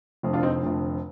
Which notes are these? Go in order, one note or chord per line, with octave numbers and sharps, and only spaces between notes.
F1 F2 D3
D4 F4
C4 D#4
F1 F2 D3